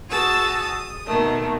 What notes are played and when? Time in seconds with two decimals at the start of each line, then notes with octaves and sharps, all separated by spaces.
0.10 F#4 G#4 A5 D#6 E6
0.61 D#6
1.06 B2 D#3 A3